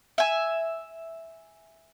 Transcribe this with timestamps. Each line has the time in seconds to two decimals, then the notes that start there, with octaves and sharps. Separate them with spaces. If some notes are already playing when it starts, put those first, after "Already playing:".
0.18 E5 G#5